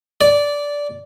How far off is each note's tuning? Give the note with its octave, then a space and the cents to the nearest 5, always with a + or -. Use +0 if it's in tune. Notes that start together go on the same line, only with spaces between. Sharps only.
D5 -10